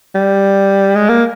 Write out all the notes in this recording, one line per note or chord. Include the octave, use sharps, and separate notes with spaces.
G3
G#3
A#3